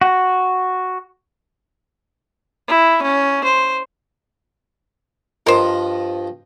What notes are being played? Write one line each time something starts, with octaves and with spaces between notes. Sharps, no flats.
F#4
E4
C#4
C5
G2 F3 A#4 C5 D#5